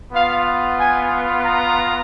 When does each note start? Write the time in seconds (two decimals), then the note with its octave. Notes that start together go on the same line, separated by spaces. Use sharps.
0.12 B3 F4 F5
0.78 G#5
1.45 A#5